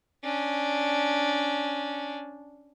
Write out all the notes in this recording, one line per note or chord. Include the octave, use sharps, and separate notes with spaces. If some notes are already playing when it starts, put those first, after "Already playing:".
C#4 D4